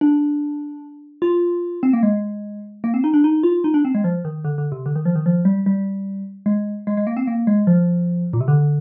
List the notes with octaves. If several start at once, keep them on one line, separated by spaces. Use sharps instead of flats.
D4
F4
C4
A#3
G#3
A#3
C4
D#4
D4
D#4
F4
D#4
D4
C4
G#3
F3
D#3
D3
D3
C3
D3
D#3
F3
D#3
F3
G3
G3
G#3
G#3
G#3
A#3
C4
A#3
G#3
F3
A#2
C3
D3